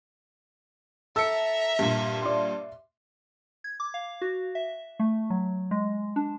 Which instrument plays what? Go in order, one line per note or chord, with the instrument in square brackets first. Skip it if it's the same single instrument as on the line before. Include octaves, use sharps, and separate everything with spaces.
[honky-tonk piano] A4 [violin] E5 A#5 [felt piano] E6 C#7
[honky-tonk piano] G2 A#2
[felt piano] D5 E5 C6
[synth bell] G#6
D6
F5
F#4
E5
A3
F#3
G#3
D4